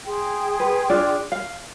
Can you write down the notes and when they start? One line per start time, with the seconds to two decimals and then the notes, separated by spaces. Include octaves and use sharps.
0.06 G#4 G5 C6
0.60 B4
0.90 D4 F4 D5
1.32 F5